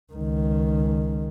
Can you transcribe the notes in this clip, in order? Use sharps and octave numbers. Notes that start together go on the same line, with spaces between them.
C#2 D#3